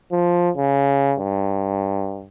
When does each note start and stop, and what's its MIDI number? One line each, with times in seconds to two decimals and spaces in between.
0.12 0.50 53
0.57 1.14 49
1.19 2.27 43